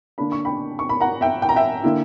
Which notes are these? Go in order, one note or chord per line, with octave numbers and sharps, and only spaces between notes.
D3 A#3 D4 B5
C#6
G5 B5
C#6
B5
F#5 A#5
E5 G5
G5
A#5
E5 G5
D3 A#3 E4